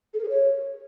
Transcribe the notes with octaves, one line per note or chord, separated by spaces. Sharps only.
A4
A#4
G#4
C#5